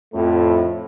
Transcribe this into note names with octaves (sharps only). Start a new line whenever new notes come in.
F2 A2 A3